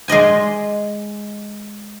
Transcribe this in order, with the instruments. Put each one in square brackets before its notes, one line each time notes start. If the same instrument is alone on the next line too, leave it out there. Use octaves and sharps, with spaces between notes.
[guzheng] G#3 D5 D#5 G#5